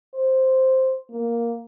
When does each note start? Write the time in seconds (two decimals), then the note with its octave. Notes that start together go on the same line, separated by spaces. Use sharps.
0.14 C5
1.11 A#3